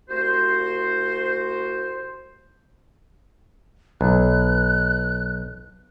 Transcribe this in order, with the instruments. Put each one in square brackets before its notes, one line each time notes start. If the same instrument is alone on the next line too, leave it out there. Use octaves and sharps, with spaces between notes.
[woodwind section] C2 A3 F#4 C5
[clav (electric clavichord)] B1 [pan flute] F#6